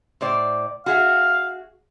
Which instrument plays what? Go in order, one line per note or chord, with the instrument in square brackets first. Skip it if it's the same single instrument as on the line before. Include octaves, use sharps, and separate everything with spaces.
[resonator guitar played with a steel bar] A2 C5 D5
[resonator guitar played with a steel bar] F#4 G#4 E5 [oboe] F5